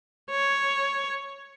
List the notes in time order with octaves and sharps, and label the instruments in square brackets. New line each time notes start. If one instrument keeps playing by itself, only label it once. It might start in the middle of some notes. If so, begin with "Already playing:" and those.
[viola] C#5